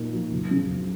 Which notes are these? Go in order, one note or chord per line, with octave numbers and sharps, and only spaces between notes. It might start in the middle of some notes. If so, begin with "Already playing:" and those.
Already playing: A#2 A#3 D#4
F3
F#1
C#3
F#1